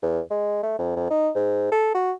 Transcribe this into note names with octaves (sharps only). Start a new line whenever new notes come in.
E2
G#3
A3
F2
F2
D#4
G#2
A4
F#4